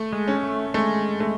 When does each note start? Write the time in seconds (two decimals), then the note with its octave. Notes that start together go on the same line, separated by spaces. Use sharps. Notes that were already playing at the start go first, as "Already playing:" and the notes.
Already playing: A3
0.13 G#3
0.28 C#4
0.43 A3
0.74 G#3 A3
1.20 A3